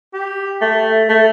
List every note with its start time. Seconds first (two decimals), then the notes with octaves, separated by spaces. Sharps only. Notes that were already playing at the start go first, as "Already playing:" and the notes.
0.14 G4
0.62 A3
1.09 A3